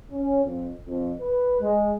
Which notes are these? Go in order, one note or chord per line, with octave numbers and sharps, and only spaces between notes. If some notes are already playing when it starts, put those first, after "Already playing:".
C#4
F2
F2
B4
G#3